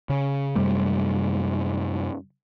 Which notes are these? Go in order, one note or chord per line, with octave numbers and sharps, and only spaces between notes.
C#3
F#2 C3 G3 A3